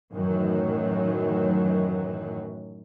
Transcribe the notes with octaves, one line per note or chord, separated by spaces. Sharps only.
F#2 A2 D#3 E3 F#3